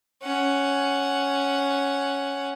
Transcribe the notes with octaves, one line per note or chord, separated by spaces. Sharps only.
C#4 F#5